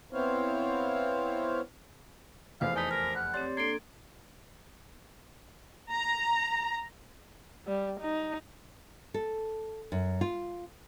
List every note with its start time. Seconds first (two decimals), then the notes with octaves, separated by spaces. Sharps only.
0.13 B3 C4 E4 C5 C#5 F5
2.61 F1 E2 C5 F5
2.76 D#4 G#5 A5 B6
2.91 A#4 F6
3.15 F#5
3.34 C4 G4 C#5 D5 C6 A6
3.57 A#3 D4 A4 C6 G#6 D7
5.91 A#5
7.67 G3
8.00 D#4
9.14 A4
9.92 F#2
10.21 F4